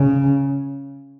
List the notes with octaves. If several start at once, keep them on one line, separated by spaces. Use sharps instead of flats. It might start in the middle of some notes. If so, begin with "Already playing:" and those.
Already playing: C#3